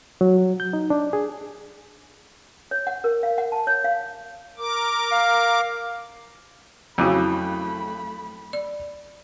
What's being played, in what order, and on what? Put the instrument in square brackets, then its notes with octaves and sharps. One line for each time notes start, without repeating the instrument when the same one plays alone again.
[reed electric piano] F#3
G6
D#4
D4
G#4
[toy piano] C#5
F#5
A#4
F5
F#5
A5
C#5
F5
[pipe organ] A#4 D6
[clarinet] F5
[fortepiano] F2 C#3 [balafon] F#3 E4 F#4 [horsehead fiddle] A3 B5
[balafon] D5